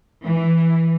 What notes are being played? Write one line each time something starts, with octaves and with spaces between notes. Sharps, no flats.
E3